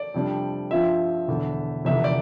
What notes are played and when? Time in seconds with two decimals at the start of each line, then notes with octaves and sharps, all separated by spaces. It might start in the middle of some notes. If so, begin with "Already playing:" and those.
Already playing: D5
0.14 F2 C3 G3 D4
0.71 G2 F3 C4 F4 E5
1.28 E1 E2 D3
1.85 F1 E2 D3 E5
2.04 D5